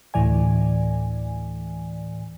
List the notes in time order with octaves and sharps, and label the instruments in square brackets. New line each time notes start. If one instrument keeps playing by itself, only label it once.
[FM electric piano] D2 A2 E3 D5 G#5